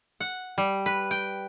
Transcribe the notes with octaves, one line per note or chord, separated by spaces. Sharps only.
F#5
G3
B4
G5